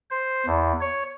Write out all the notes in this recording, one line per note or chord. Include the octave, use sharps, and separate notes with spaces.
C5
E2
C#5